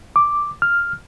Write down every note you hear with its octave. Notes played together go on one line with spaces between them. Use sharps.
D6
F6